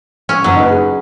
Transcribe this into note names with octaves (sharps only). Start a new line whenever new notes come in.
C#4
F#1 F#3
D#4 B4
G#4